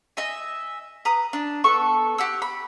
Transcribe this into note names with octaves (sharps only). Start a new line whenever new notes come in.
D#5 E5 G#5
B4 A#5 D#6
D4
B3 A4 C#6
G4 F#5 E6
B5